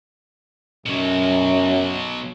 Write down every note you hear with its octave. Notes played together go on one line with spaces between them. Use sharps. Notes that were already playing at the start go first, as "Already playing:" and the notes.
F#2 B2 F#3